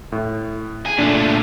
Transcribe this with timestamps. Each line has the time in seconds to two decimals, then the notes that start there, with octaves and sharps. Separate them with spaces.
0.12 A2
0.86 G#4
0.98 A#2 A3 D4